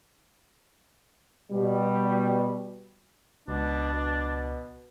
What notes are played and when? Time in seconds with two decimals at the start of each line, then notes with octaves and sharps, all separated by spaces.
1.51 B2 G3
3.48 C#2 B2 D4
3.94 B2